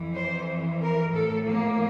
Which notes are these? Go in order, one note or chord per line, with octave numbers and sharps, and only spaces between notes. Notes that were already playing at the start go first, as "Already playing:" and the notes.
Already playing: F2 E3
C5
A#4
A2 F3 A4
A#3